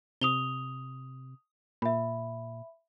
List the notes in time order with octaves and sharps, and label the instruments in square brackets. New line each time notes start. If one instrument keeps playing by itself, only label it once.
[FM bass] C3 [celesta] D#6 F7 G7
[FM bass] A#2 [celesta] E5 B5